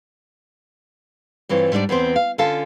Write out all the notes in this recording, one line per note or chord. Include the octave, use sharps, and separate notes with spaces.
G2 E3 C4 F4 C#5
G#2 G3 D4 D5
E2 B3 C4 C5
F5
D3 C#4 F4 A4 F5 A5